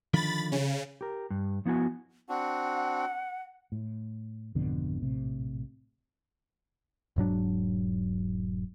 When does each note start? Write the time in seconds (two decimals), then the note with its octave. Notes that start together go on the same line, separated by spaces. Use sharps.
0.14 D3 D#3 F3 B5 A6
0.52 C#3
1.01 G4 A#4
1.30 G2
1.65 F3 B3 E4 F#4 G#5
2.29 C4 D4 F#4 F#5
3.72 A2
4.55 G#1 F2 B2 D3
5.02 A#1 A2 C3
7.16 E1 G#2 F#3 D4